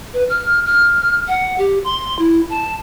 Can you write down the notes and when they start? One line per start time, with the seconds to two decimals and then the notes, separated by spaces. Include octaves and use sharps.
0.14 B4
0.30 F6
0.66 F6
1.28 F#5
1.58 G4
1.84 C6
2.19 E4
2.50 A5